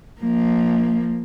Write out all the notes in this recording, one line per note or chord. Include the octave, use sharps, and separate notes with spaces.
F3 A#3